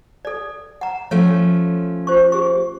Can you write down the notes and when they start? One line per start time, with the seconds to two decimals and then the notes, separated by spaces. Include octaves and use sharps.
0.25 A4 D5
0.81 F#5 A#5
1.11 F3 A3 C#4 C#5
2.07 F4 C5 C#6
2.32 G4 G#4 C#6